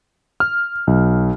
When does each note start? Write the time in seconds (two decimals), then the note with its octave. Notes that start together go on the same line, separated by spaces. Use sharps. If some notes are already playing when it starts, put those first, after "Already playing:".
0.40 F6
0.87 B1